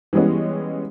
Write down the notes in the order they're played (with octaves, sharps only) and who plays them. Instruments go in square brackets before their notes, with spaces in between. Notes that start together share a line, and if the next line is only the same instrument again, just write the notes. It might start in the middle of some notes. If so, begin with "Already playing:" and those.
[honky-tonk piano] E3 G3 G#3 B3 C#4